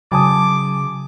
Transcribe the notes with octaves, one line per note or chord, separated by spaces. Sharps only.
C#3 F#3 G#5 A5 D6 D#6